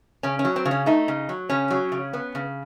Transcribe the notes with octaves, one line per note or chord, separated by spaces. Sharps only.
C#3 C#4
C#4
F#3
C4
C#3
C#4
A3 D#4
C#3
F#3
C#3 C#4
F#3
C#3
B3
C#3